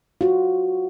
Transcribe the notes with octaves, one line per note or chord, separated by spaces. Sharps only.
F4 F#4